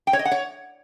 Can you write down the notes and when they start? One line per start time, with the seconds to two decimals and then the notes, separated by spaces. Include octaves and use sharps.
0.07 G5
0.13 C#5
0.19 D#5
0.25 F#5
0.31 C#5